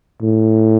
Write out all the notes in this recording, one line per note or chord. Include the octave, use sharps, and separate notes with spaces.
A2